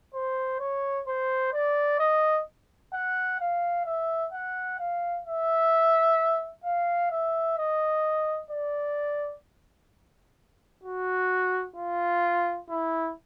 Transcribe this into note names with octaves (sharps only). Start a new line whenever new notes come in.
C5
C#5
C5
D5
D#5
F#5
F5
E5
F#5
F5
E5
F5
E5
D#5
D5
F#4
F4
E4